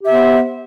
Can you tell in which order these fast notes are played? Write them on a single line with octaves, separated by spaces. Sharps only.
G4 E5 B3 C5